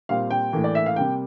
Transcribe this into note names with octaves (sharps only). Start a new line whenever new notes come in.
A#2 G3 C4 F5
G5
A2 E3 A#3
D5
E5
F5
C3 G3 A#3 G5